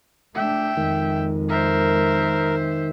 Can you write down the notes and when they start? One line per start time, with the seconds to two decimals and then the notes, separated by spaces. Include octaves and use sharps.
0.35 A3 D4 E5 G5
0.77 F2 D#3 G#3
1.49 A#4 C5 E5